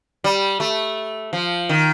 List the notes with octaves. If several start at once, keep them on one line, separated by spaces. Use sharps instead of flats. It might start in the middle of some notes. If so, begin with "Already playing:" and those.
G3
A3
F3
D#3